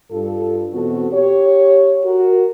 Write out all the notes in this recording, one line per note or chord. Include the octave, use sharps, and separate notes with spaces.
G2 F4 A4
E2 B2 B3 C4 F#4 A4
G4 C#5
F#4 A#4